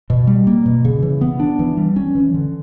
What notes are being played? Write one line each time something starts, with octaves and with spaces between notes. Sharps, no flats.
B2
G3
A#3
B2
C#3
E3
B3
D4
E3
G3
C#4
E3
D3